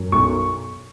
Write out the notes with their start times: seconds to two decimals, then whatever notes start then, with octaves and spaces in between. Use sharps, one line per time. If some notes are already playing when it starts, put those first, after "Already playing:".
Already playing: F#2
0.12 B1 C#6